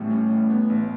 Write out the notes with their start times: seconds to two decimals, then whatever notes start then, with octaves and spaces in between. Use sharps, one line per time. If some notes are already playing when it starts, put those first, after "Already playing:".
Already playing: A1 A2 G3 A3 C#4
0.10 C#4
0.30 A1
0.50 B3
0.70 A1